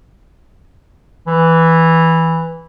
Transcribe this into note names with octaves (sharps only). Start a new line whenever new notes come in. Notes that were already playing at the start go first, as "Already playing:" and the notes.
E3